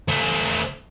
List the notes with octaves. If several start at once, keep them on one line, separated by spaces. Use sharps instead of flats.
A3 C4